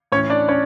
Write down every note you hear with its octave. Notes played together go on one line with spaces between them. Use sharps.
A2 E3 C#4 C#5
D4 D5
C#4 C#5